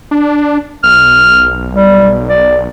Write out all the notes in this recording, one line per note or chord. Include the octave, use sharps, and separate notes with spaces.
D4
B1 F6
G3
D5